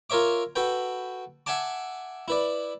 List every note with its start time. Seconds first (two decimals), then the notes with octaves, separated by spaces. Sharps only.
0.10 F4 A#4 C#5 E5 D6
0.56 F#4 A4 B4 G5
1.46 E5 F#5 G#5 A5 D6
2.28 E4 B4 D5